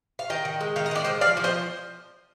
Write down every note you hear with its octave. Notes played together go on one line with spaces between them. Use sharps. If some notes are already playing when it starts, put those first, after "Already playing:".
F5
D#3 D#5 G5
D#3
G#3
D#3 F5
D#5
G#3 D5
D#3 C5 D#5
F3 D5 F5
F3
C5 D#5